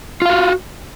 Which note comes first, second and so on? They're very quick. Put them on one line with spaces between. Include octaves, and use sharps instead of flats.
F4 F5 F#4